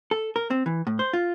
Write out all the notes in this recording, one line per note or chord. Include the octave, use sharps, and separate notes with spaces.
A4
A#4
C4
E3
A2
C5
F4